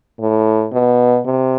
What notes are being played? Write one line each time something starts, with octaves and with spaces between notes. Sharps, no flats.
A2
B2
C3